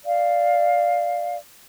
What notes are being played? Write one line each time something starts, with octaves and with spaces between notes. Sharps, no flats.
D5 F5